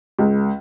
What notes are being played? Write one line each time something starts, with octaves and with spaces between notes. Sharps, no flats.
C#2